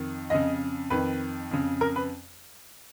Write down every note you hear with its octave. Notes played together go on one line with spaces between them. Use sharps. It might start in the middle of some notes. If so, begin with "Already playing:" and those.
Already playing: F2 D#3
F2 C#3 D#5
F2 D#3 B4
F2 C#3
A#4
B4